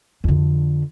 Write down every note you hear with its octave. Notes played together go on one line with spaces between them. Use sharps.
F2 D3